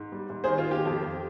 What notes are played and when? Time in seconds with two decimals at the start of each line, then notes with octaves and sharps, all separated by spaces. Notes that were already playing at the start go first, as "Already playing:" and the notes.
Already playing: G#2
0.12 G3
0.30 G#2
0.44 D#3 G#4 C5
0.58 F4
0.67 D#3 G4
0.85 F2 G4
1.03 F2